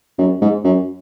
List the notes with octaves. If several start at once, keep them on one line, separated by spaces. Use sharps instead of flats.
F#2
G#2
F#2